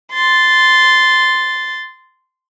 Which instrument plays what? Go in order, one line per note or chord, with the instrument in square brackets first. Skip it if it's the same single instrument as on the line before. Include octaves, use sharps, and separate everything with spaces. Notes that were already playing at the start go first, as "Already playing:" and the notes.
[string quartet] C6 A6